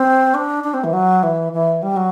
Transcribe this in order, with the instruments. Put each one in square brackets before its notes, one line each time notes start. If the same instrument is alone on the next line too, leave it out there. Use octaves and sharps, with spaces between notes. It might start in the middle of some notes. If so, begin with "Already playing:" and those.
Already playing: [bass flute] C4
D4
D4
C4
E3
F#3
E3
E3
G3
F#3